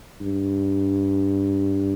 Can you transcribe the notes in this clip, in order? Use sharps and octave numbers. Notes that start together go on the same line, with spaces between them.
G2